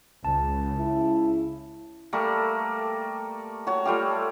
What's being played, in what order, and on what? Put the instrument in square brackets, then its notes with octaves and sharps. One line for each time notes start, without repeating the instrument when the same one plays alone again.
[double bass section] C#2 [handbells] A5
[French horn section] C#3 E4
[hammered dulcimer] G3 A3 A#3
F#4 C#5
G3 A3 F4 G4